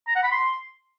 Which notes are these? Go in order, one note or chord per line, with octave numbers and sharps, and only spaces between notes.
A#5
F#5
B5
C6